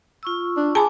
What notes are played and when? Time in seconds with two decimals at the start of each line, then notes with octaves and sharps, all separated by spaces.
0.23 F4 C#6 E6
0.57 D4
0.75 G#4 G#5 A5 B5 D6